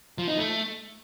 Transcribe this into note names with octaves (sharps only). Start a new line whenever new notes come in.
F3
D#4
A3